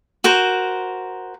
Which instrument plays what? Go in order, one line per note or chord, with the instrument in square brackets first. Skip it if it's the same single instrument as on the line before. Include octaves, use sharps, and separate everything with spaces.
[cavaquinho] F#4 A#4 C5